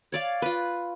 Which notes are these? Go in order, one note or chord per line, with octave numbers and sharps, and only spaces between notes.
C#5 D5 F5
F4 B4